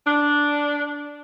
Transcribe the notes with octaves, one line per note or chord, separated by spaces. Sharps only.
D4